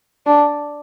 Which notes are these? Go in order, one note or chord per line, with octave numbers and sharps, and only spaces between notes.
D4